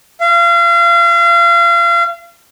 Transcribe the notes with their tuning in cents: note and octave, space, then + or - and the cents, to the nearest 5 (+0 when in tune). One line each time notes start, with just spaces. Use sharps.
F5 -35